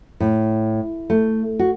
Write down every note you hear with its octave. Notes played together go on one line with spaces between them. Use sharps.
A2
A3
F#4